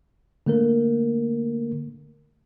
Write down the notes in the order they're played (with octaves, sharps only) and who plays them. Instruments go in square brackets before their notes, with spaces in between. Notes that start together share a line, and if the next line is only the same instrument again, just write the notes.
[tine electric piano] D3 A3 A#3 A#4